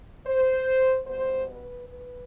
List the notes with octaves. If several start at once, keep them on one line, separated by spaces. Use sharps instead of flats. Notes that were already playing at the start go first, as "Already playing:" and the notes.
C5
B2 G3 B3 C5
B4
B4